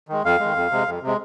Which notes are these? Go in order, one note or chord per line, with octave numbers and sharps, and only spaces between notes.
D#3 G#3
F2 F5
D#3 G#3
F2
C3 G#3
F2
C3
G#3